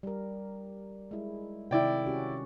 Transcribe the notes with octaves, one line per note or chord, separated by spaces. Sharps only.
G3 A#4
G#3 E4
C3 D#3 E4 D5 G5
C#4 F#4 G4